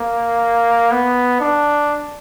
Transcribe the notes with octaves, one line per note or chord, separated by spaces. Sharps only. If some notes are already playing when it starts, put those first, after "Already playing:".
Already playing: A#3
B3
D4